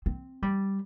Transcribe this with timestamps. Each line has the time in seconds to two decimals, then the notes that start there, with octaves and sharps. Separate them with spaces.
0.06 C4
0.42 G3